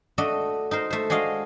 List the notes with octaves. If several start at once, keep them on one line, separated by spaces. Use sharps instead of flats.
A3 D4 F#4 D#5
D#4 A#4 C5
A3 C5
G#3 D4 F#4 D#5 F5